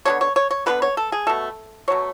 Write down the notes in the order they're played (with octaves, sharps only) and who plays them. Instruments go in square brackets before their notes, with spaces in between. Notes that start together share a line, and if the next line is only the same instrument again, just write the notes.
[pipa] D3 G#3 B3 C#5
C#5
C#5
C#5
D3 F#3 B3 B4
C#5
A4
G#4
B2 A3 A4
B2 F#3 A3 C#5